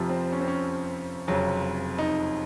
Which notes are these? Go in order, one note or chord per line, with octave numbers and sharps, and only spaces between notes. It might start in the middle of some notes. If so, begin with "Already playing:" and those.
Already playing: F1 F2 C3 F3
C4
C#4
C4
C#4
F1 F2 C#3 F#3
D#4